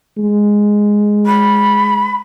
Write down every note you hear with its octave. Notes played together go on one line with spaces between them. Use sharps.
G#3
B5